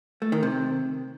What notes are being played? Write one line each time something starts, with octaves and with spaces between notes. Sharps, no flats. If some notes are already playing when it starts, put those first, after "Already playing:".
A3
D#3
C3